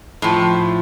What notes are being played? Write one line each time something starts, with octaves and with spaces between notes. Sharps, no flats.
A2 F3